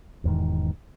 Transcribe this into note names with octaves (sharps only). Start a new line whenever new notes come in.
E1 E2 G#2 D#3